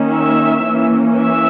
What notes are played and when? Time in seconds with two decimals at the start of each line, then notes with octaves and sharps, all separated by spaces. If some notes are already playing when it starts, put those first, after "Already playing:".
Already playing: D#3 A#3 C#4
0.12 E5
0.65 E3 A#3 C#4
1.19 E5